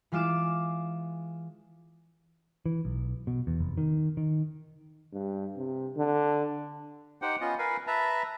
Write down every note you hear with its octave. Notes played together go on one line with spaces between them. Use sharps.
E3 G#3 F4 D6 E7
E3
B1
B2
E2
F1
D#3
D#3
G2
C3
D3
D#4 G4 C5 F#5 G5
B3 C#4 F4 D#5
A#4 B4 F5 G#5
B4 E5 A5 A#5